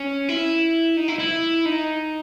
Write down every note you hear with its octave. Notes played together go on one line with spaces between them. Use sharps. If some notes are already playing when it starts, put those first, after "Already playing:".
Already playing: C#4
E4
D#4
E4
E4
D#4